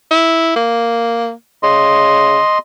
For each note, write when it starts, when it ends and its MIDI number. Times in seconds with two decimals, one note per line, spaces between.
0.11 0.53 64
0.56 1.31 58
1.63 2.37 49
1.63 2.58 75
1.63 2.58 84